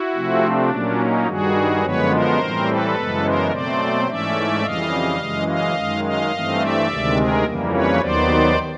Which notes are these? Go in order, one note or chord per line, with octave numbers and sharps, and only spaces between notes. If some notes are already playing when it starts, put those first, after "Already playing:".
Already playing: E4 F#4
C3 F3 A3 C4
D4
A#2 F#3 A#3 C#4
D#4
G2 D#3 G3 F#4 G#4
F#2 D3 F3 G#3 B3 B4 C#5
A#4 C5
A2 E3 G3 C4
A4 B4
F#2 C#3 E3 G#3 B3
A#4 C5
B2 F#3 A3 C4 C5 D5
G#2 E3 A3 C#4 D5 E5
F2 C#3 E3 G3 D#5 F5
F#2 C#3 E3 G#3
D#5 F5
F#2 D#3 G#3
D#5 F5
G2 E3 A3 C4
D5 E5
D2 C3 D#3 G#3
G#4 A#4
F2 C#3 E3 G3 A#3
B4 C#5
D#2 D#3 F#3 B3 C5 D5